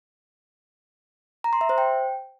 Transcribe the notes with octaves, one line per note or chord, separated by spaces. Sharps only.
A#5
C6
E5
C5
G5